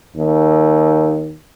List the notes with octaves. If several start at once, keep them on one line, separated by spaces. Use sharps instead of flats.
D#2